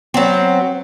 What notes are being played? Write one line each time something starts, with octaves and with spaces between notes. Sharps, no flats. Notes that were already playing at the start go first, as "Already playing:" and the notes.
F#3 B3 C4